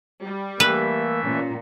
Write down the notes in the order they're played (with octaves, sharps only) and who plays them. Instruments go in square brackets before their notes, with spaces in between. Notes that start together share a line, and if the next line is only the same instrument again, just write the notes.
[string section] G3
[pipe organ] E3 A3 E5 [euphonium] A#3 [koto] B4
[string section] A#2 [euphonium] C#4